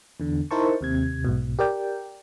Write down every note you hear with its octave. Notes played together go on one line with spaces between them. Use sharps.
E2 D3
D#4 E4 A#4 C5 A5 C#6
D#2 C3 G#6
B1 G#2 B2
G4 A#4 D5 G5